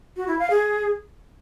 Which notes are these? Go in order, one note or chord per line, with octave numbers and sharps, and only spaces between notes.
F#4
E4
F5
G#4